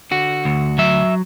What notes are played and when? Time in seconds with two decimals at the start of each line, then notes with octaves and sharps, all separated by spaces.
0.11 D3 F#4
0.45 D2
0.78 F#3 E5